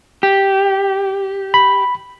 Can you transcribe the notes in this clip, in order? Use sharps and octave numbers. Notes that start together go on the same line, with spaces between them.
G4
B5